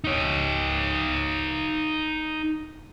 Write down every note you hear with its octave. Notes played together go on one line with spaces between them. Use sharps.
D#4 C#5